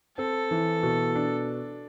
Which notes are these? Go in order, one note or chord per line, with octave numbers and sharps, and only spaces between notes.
C4 A4
E3
B2
D4